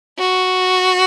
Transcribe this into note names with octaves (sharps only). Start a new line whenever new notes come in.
F#4